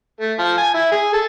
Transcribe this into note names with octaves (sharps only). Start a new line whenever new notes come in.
A3
F3
G#5
E4
G#4
A4